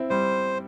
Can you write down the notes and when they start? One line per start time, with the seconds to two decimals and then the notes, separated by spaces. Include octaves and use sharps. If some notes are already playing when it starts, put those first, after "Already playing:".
Already playing: C4 E4
0.10 G3 C5